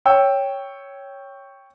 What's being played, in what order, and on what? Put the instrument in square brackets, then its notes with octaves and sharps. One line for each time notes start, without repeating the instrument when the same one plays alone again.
[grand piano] C#5 G5 E6